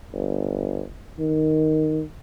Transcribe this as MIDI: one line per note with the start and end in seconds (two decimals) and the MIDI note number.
0.14 0.83 31
1.19 2.02 51